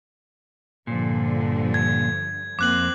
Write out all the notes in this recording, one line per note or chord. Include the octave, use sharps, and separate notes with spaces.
G2 A#2 D3 F3
G#6
F2 A#3 C4 D6 F#6 F#7